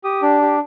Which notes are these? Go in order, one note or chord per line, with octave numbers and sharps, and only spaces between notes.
G4 D#6
D4
G4